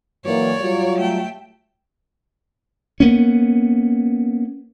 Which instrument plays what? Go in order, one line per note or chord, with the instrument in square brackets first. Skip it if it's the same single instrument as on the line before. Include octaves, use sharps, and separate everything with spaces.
[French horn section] E3 F#3 A#3 [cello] C#5 D5
[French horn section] F#3 G3 F4
[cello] A3 G5
[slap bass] A#3 B3 C#4